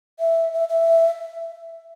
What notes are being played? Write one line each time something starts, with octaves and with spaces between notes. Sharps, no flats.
E5
E5
E5